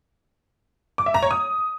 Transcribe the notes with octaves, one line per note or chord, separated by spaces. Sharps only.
D6
E5
A#5
C#5
D#6